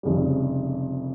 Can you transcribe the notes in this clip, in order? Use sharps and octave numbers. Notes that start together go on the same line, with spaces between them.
F1 F2 C#3 G3